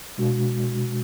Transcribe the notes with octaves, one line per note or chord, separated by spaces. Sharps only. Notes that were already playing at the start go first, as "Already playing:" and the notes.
B2 G#3 D4 F#4